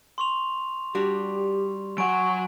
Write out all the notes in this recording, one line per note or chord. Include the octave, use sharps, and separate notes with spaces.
C6 C#6 F7
G3 D4 F#4 G4
F#3 F#5 G#5 C#6 D7